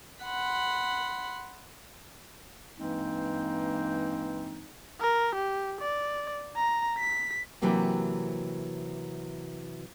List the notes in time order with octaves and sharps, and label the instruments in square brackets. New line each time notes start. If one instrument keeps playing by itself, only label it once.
[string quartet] F#5 B5 C6
[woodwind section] G2 E3 G#3 A#3 C4 D#4
[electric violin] A#4
G4
D5
A#5
B6
[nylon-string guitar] C3 E3 F#3 A#3 C4 G4